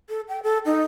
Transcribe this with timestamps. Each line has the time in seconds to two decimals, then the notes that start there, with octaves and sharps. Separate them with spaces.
0.09 A4
0.29 G5
0.43 A4
0.66 D#4